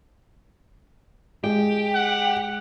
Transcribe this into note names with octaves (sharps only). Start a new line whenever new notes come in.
G#3 G4
F#5